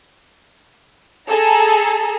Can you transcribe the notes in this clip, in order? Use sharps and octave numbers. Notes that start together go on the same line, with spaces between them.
G#4 A4 A#5